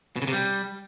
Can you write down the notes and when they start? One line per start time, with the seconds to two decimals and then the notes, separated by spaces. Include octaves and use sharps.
0.16 B2
0.22 C#3
0.27 C3
0.33 G3